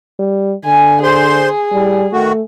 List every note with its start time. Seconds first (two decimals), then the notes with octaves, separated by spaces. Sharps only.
0.19 G3
0.65 D3 G#5
1.03 G#4 C5 C6
1.72 A2 G3
2.12 D#3 A3 F#4